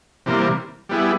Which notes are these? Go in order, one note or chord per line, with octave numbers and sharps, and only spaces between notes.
C3 E3 G3 A#3
G3 B3 E4 G#4